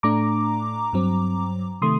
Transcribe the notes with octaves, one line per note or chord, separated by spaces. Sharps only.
A2 A3 D4 A#5 D6
G2 F#3 C4
C3 D#3 A3 C6 D#6